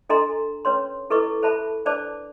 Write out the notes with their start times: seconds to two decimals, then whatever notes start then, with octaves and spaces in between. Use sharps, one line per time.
0.09 D4 A4 D#5 G#5 A#5 C6
0.65 C#4 B4 C#5 C6
1.10 E4 A4 B4 D#5 C#6 D6
1.42 A4 C5 E5 A5 B5
1.85 D4 B4 C5 D5 A5 D6